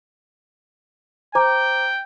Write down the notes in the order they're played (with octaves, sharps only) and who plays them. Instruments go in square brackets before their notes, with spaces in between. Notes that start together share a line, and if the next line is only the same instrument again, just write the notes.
[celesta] C5 A#5 D6 [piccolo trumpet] G5